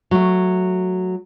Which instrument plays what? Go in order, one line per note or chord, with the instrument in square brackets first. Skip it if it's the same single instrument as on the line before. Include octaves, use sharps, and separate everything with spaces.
[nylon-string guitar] F#3 A3